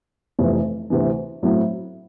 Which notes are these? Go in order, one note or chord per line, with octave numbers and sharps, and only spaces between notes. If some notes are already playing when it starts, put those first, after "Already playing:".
F1 F2 C3 E3
D2 C3 E3
A2 F#3 A3 C4 E4